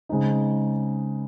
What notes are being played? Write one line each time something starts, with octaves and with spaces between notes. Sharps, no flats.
C#3 G#3 C4 D#4